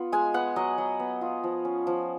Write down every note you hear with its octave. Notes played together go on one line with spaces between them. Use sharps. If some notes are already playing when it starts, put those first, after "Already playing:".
Already playing: B3 F4
G#3 G#5
B3 F#5
F#3 D#5
F#3
B3
F4
F3
C#4
F3